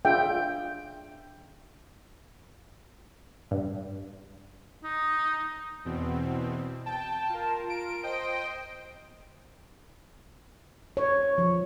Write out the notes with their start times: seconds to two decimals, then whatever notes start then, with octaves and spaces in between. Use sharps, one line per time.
0.05 D4 F4 G#4 E5 G5
3.51 G2
4.84 D#4
5.85 E2 B2 C4
6.86 G5 A5
7.29 F4 A#4
7.70 D7
8.03 C5 D#5 G5
10.97 C#5
11.38 F3